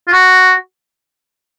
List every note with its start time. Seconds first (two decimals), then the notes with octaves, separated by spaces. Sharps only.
0.08 F4
0.12 F#4